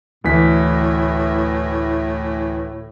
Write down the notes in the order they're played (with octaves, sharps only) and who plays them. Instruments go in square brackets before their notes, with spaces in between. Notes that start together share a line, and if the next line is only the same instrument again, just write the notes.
[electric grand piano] D2 E3 B6 [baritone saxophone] A2